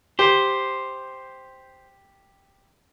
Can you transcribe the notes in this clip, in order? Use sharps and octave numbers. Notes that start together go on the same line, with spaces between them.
G4 C5